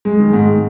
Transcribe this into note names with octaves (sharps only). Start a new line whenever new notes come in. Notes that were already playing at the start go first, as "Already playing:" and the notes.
G#3
D#3
G#2